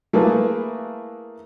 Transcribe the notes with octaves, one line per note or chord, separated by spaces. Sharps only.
A3 A#3 E4 G#4 B4